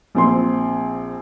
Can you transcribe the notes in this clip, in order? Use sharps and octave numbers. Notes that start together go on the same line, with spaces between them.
A#1 C4 C6